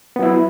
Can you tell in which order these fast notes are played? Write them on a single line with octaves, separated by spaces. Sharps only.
B3 F#3 E4